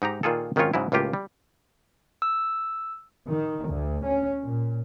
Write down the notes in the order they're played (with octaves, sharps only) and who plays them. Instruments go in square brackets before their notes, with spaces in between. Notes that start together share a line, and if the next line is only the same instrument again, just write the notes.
[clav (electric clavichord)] G#2 D#4 G4 A#5
A#2 D#3 F4 G#4 A4
G#1 D#3 F#3 C#4 F4 C#5
G#2 C#3 F#3 E4
C#2 A2 A#3 F4 G4
G3
[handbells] E6
[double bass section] D#3
D2
C#4
A#2